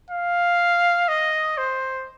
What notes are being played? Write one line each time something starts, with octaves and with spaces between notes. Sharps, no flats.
F5
D#5
C5